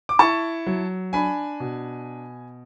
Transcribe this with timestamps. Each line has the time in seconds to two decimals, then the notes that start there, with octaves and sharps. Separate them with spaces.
0.09 D6
0.19 E4 A5 C#6
0.67 F#3
1.13 D4 G#5 B5
1.60 B2